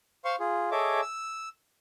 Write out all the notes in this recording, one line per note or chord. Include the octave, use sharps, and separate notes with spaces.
C5 F5 C6 C#6
F4 G#4
G#4 A4 C#5 D#5 E5 D6
E6